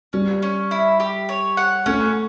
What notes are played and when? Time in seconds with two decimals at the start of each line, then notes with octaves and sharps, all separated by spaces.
0.13 G3 C#4
0.42 C#4
0.71 E4
1.00 G4
1.29 C#5
1.57 F#5
1.86 A3 C#4